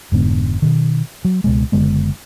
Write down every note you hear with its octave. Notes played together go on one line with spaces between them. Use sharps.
F1 G#2 D3 B3
B2 D#3
F#3
C#2 B2 G#3
F#1 D3 G#3 B3